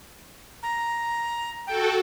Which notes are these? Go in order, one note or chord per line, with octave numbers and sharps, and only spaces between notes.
A#5
F#4 A4 G5